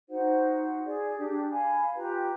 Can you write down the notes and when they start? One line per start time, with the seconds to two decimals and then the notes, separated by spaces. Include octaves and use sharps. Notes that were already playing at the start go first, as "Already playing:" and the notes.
0.10 D#4 F#4 C5 F#5
0.85 G#4 D5
1.18 D4 G4
1.52 F5 G#5 B5
1.96 F4 G4 B4 A#5